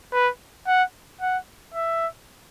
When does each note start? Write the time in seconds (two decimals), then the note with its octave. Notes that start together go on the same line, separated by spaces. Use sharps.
0.13 B4
0.67 F#5
1.21 F#5
1.74 E5